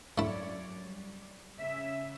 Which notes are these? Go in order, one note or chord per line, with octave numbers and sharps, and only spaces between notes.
F#2 A3 E4 C#5 D5
G3
C#3 E5